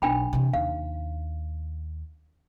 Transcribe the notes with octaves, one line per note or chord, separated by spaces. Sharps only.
B1 D4 G5 B5
C3 E3
D#2 F5